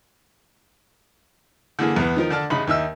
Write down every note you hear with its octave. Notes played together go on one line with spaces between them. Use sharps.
D3 E3 A#3 G#4
E2 E3 B3 B4
D#3 F3 A#4
D3 D4 D5 A5 F6
A1 C#3 D#4 B5
D#2 D#4 E5 E6